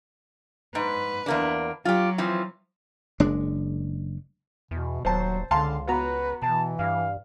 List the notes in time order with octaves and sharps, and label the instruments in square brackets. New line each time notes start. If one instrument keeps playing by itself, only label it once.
[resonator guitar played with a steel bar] G#2 [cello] B4
[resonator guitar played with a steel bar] E2 A#3 D4
[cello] F#3 [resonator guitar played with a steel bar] F4 G4
[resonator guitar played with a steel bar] E3 F3 C4
[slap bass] F#1 G#3 D4
[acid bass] E2 [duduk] B2
[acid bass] D#1 [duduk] F#3 [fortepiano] C5 A5
[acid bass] C#2 [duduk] D3 [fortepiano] F5 A5 C6
[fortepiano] B3 F#4 A#5 [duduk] B4
[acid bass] B2 [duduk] E3 [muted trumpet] A5
[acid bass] G2 [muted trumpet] F5